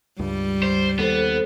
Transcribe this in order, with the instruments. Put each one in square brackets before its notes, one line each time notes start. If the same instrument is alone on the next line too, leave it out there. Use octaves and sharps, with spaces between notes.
[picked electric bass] C#2 G2 [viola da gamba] G3
[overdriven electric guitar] C5
[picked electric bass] D#2 [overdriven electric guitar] B3 [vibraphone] A4 C5